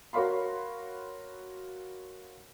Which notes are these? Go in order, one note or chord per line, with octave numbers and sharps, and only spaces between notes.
F#4 A#4 C#5 F5 B5 C6